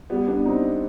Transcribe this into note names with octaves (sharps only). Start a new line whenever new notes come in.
G3 B3
B3 D4
C4 D#4